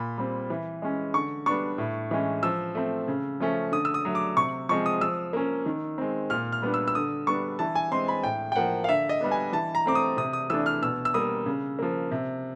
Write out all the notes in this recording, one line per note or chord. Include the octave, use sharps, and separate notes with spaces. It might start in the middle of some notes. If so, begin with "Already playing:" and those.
Already playing: A#2 B5
G3 C4
E3
G#3 C#4
D3 C#6
G3 B3 D4 C#6
A2
E3 G#3 C#4
F3 E6
A3 C4
C#3
F3 A3 C#4
D3 D#6
E6
D#6
F#3 A3
D6
C3 C#6
F3 G#3 C4 C#6
D#6
F3 E6
A#3 C#4
D#3
G#3 C4
A#2 F6
F6
G3 B3 D4
E6
E6
D3 D#6
G3 B3 D4 C#6
E3 A5
G#5
G#3 C4 C6
B5
A2 G5
G5
F3 A#3 F#5
F5
D3 E5
D#5
G3 B3 D4
G#5
E3 A5
A#5
A3 C4 D6
D#6
C3 D#6
D#6
E3 A3 D4 E6
F6
B2 E6
E6
G3 A#3 D#6
C#3
F3 A#3
C3